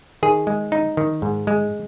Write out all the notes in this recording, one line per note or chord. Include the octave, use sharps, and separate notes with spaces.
D#3 G#4
G#3
D#4
D#3
G#2
G#3